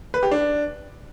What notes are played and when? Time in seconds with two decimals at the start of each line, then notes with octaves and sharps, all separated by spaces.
0.14 B4
0.23 G4
0.31 D4